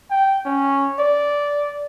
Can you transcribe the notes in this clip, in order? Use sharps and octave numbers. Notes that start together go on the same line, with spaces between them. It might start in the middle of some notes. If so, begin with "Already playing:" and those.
G5
C#4
D5